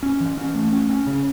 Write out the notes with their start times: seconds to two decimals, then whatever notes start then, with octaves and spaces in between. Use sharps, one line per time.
0.03 C#4
0.21 E3
0.38 C#4
0.55 A3
0.73 C#4
0.90 C#4
1.07 C#3